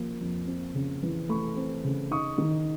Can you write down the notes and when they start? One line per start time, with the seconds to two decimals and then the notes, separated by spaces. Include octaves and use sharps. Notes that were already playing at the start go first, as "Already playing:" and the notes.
Already playing: F3 A#3
0.21 F2
0.47 C4
0.74 C#3
1.03 E3
1.29 A3 B5 C#6
1.57 C4
1.84 C#3
2.11 D#4 C#6 D#6
2.38 D#3